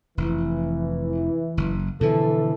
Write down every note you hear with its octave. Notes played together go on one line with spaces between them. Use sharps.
F1 E3
F#1
B2 D3 E3 F3 A4